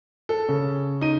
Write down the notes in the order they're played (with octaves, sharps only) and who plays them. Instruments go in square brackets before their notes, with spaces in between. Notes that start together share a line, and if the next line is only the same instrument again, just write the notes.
[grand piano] A4
[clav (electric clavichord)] C#3
[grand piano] D#4 D#7